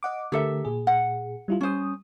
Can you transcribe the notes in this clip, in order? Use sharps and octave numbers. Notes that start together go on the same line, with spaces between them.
D#5 F#5 D6
D3 A3 G4 A4 A#4 E5
A#2 G#4
F#5
G3 E4 F4
G3 C#4 C5 D#6